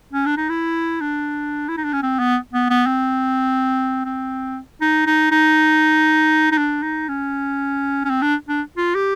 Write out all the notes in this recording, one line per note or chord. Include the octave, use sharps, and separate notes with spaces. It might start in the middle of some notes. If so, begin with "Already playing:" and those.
C#4
D4
D#4
E4
D4
E4
D#4
D4
C#4
C4
B3
B3
B3
C4
C4
D#4
D#4
D#4
D#4
D4
D#4
C#4
C#4
C4
D4
D4
F4
G4